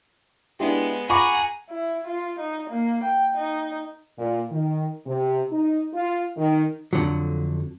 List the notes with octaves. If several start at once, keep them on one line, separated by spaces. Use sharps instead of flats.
G#3 B3 D4 E4 G4
F4 G#4 F#5 A#5 B5 C#6 D6
E4
F4
D#4
A#3
G5
D#4
A#2
D#3
C3
D#4
F4
D#3
F2 A#2 D3 F3 F#3